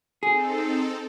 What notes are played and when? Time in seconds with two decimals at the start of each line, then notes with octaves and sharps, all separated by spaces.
0.23 C4 D#4 G#4 A4